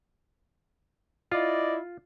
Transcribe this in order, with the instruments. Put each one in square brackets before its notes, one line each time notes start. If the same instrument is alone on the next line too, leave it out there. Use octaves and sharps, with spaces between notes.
[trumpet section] E4 D5 D#5 [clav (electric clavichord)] F4